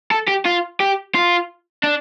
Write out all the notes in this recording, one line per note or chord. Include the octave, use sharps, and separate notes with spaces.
A4
G4
F4
G4
F4
D4